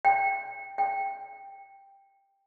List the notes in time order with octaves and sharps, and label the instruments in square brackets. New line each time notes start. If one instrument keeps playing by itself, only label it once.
[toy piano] G5
G5